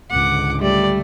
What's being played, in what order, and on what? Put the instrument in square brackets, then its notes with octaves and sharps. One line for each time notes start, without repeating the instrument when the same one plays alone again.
[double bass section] C#2 G#2 D3 [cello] F#5 [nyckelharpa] D6
[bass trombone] G3 [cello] A3 [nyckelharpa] D5